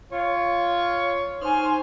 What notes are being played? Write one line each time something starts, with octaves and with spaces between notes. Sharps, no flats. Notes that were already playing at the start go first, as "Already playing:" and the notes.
F4 C#5
D#4 C5 G#5 C6 C#6 F6